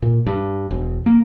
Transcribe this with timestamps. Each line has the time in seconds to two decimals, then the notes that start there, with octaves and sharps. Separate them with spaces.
0.02 A#2
0.26 G2
0.71 E1
1.06 A#3